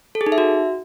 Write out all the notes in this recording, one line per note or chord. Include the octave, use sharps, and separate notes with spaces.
A4
G#4
D#4
E5
F#4